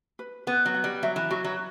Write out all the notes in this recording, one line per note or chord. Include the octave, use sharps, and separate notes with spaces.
B4
B3 B4
F#3
F#5
G3
F#3 E5
E3
F#3 F#4
F#3